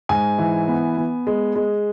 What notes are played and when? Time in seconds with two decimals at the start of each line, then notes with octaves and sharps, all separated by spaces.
0.09 G#2 G#5
0.38 E3
0.68 B3
0.97 B3
1.27 G#3
1.55 G#3